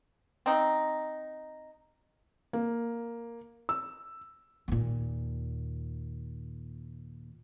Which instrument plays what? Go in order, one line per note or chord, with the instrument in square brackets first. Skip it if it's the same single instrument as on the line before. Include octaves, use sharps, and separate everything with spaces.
[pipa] C4 D#4
[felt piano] A#3
E6
[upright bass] D#2 A#2